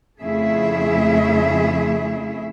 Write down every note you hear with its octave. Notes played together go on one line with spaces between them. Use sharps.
F2 C#3 A3 E4 G#4 E5